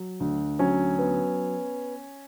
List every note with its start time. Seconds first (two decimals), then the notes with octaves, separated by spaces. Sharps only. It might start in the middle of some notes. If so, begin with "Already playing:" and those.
Already playing: F#3
0.20 D2
0.59 F#3 C#4
0.99 B3